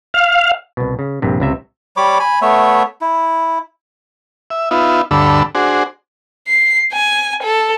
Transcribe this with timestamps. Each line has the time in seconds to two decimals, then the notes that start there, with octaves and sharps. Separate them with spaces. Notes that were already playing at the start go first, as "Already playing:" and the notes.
0.14 F5
0.77 C2 B2
0.99 C#3
1.22 A#1 G2 C3
1.40 C#2 C3 E5
1.97 G3 C#5 B5 D6
2.20 G#5 B5
2.42 A3 B3 C#5 E5
3.01 E4
4.50 E5
4.71 B3 D#4 F4 E5
5.11 D2 G2 D3 A4 B5 E6
5.55 D4 F#4 G#4 C5
6.48 C7
6.93 G#5
7.43 A4